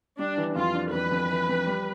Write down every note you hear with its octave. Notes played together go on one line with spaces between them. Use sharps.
G3 D4
E3
F2 F4
D4
F2 B4
F2
E3
F2
G3